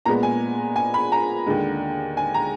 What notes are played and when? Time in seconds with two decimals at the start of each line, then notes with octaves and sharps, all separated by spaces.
0.05 A#2 G#3 B3 A#5
0.23 G#5
0.76 G#5
0.94 B5
1.12 A#5
1.46 D#2 D3 G#3
2.17 G#5
2.34 A#5